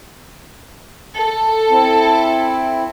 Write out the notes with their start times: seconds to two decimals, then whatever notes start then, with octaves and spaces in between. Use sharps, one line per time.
1.13 A4
1.71 C4 E4